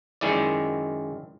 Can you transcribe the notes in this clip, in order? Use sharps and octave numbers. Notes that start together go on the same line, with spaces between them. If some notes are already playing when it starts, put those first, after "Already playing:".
F#2 D#3 G#3 E4 D5